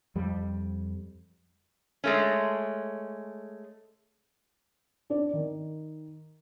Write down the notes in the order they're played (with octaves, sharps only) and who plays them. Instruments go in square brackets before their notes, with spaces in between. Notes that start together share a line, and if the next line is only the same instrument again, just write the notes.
[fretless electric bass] F2 G3
[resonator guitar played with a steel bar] G#3 A3 C#4
[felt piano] D4 D5
D#3